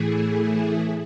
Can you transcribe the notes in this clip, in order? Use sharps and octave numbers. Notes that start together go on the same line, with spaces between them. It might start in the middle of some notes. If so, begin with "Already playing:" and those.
Already playing: A2 E3 A3 E4 G#4